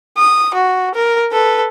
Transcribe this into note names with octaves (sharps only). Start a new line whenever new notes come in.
D#6
F#4
A#4
A4 B4